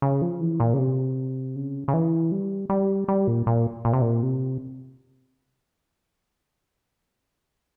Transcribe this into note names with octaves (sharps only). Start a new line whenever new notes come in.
C#3
F3
E3
A#2
C#3
C3
C#3
C#3
E3
G3
G3
G3
A#2
A#2
A#2
C3
A#2
C3